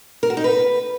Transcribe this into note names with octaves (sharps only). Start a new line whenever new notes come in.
A#4
F#4
D#4
B4